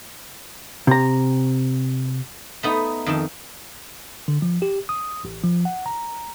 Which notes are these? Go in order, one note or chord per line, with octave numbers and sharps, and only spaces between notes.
C3 A#5
A3 B3 D#4
F2 D#3 A5
D3
F3
G4
D#6
A1
F3
F#5
A#5